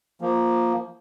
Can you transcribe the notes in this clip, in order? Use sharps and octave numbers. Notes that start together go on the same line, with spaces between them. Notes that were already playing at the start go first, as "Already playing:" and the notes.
F3 A#3